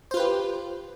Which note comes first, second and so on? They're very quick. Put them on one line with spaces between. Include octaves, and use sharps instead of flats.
C5 F4 B4 G4